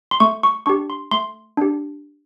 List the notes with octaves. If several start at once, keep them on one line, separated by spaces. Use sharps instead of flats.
C6
A3 C#6
C#6
D4 G4 C#6
C6
A3 C6
D4 G4